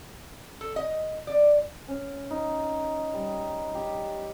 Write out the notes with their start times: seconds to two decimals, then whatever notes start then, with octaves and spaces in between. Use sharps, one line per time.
0.61 A4
0.76 D#5
1.27 D5
1.88 C#4
2.31 D#4
3.14 G3
3.75 G4